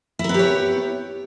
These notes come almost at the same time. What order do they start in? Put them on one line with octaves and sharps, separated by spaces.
E4 A#4 B3 G4 C#5